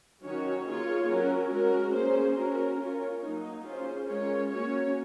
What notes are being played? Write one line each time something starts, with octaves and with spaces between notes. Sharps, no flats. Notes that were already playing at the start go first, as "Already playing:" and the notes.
D#3 F#3 C#4 F#4 C#5
A#3 F4 G#4 C#5
F#3 C#4 F#4 A#4
G#3 C#4 F#4 A#4
A#3 C#4 G#4 C5
C#4 F#4 A#4
C#4 F4 A#4 C#5
F#3 A#3 D#4
C#4 F4 G#4 C5
G#3 C#4 F4 A#4 C#5
A#3 C#4 F#4 C#5